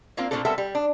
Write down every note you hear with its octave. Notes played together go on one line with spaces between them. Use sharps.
A#3 C4 D4 F4
A#2 E3 A3 C4 D4 A4
G3 B3 C4 A4 A#4 E5
G3
D4